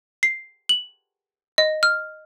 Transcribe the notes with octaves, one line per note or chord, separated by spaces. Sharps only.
C7
F#7
D#5
F6